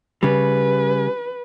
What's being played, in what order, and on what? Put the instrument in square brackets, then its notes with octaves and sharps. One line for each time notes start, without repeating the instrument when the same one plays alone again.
[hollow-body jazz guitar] C#3 G3 [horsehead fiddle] B4